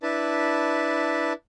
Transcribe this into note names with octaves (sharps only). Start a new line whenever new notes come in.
D4 E4 B4 A5